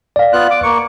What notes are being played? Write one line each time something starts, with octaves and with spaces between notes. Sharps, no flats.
D5 F5
B3 F4 F#6
D6
A#3 C#6